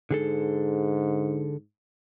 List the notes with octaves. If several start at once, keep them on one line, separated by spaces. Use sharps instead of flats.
G#2 D3 G#4 A4